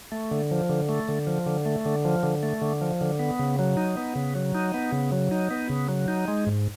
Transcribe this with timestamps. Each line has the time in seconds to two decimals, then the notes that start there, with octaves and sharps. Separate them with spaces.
0.12 A3
0.31 D3
0.51 F3
0.70 D3
0.89 A3
1.09 D3
1.27 F3
1.46 D3
1.65 A3
1.86 D3
2.05 F3
2.23 D3
2.43 A3
2.62 D3
2.81 F3
3.01 D3
3.19 B3
3.39 C#3
3.59 F#3
3.77 D#4
3.97 B3
4.16 C#3
4.35 F#3
4.55 D#4
4.74 B3
4.92 C#3
5.12 F#3
5.31 D#4
5.51 B3
5.70 C#3
5.89 F#3
6.08 D#4
6.28 G#3
6.47 G#2